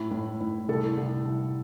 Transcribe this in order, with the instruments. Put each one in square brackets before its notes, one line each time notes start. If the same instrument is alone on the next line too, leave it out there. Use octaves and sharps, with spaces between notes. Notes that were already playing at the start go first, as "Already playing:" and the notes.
Already playing: [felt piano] A2 E4
A2
A2
C2 A4
C2
C2